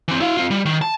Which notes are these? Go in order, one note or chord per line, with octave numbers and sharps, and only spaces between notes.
E3 C4
E4 F5
C4 F4
G3
D#3
A5